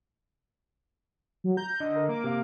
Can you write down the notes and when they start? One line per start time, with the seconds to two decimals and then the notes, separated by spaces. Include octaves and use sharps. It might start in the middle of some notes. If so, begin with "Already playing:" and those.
1.44 F#3
1.57 A#5 G6
1.80 D3 D#5
1.96 A#4
2.09 A#3 D6
2.24 C3 F5